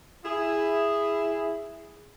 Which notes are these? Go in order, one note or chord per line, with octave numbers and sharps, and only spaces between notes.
E4 G#4